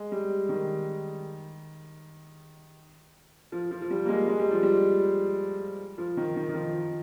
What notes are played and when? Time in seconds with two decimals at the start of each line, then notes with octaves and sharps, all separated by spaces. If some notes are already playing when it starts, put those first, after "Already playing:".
Already playing: G#3
0.12 G3
0.49 D#3
3.52 F3
3.71 F3
3.82 F3
3.90 G3
4.05 A#3
4.09 G#3
4.28 G#3
4.39 G3
4.51 F3
4.63 G3
5.98 F3
6.17 D#3
6.36 D#3
6.49 D#3
6.54 F3